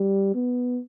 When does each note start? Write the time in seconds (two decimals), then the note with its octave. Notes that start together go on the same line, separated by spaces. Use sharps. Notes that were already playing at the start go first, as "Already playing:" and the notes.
Already playing: G3
0.35 B3